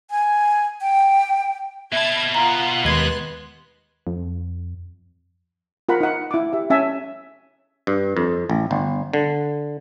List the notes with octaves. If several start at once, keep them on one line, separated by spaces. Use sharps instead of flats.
G#5
G5
B2 E5 A5 B5 G#6
F4 F#5 A#5
D#2 G#3 B4 D#5 C6 F#6 G#6 C7
F2
F4 A#4 F#5 B5
D#4 F#5
E4 D6
G4 E5
C#4 E5 G#5 A5
G2
F2
A1
G1
D3